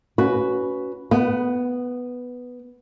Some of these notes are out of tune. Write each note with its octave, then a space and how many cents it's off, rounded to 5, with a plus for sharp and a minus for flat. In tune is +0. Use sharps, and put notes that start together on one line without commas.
C#4 +20 F#4 +5 B4 +0
B3 +0 F#5 +40